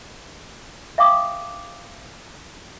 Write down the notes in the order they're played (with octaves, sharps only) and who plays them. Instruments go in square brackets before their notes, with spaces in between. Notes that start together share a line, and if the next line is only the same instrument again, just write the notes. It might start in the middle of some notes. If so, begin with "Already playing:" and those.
[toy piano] E5 F5 G5 D6 D#6